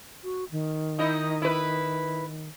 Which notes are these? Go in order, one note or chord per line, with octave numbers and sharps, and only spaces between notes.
F#4
D#3
D#4 E4 D#5
E4 B4